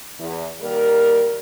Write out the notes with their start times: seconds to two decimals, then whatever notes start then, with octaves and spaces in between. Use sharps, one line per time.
0.18 E2
0.61 D#3 G3 A#3 A#4